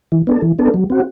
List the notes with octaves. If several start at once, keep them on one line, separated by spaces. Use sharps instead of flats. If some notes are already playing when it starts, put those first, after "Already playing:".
E3
B3 D4 A4
E3
B3 D4 A4
F#3
C4 F#4